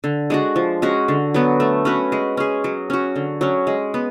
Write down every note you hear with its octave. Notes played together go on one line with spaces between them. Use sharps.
D3
G#3 D4 F#4
F3
G#3 C#4 F#4
D3
F#3 B3
A3
C#4 F#4 B4
G#3
C#4 G#4
F#3
C#4 F#4
D3
F#3 C#4
G#3
B3